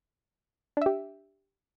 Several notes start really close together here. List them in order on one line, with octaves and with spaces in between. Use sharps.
D4 E5 G4